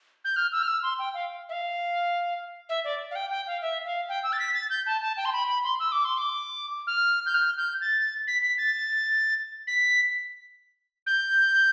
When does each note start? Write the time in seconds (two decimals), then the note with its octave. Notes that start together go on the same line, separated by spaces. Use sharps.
0.25 G6
0.36 F6
0.52 E6
0.63 F6
0.67 E6
0.83 C6
0.99 G5
1.14 F5
1.49 E5
1.52 F5
2.69 E5
2.84 D5
3.11 F5
3.15 G5
3.31 G5
3.47 F5
3.62 E5
3.85 F5
4.09 G5
4.24 E6
4.33 A6
4.39 B6
4.54 A6
4.70 G6
4.87 A5
5.02 A5
5.17 G5
5.25 C6
5.33 B5
5.48 B5
5.64 C6
5.80 E6
5.92 D6
6.05 C6
6.18 D6
6.87 F6
7.26 G6
7.34 F6
7.57 G6
7.81 A6
8.27 B6
8.42 B6
8.58 A6
9.67 B6
11.07 G6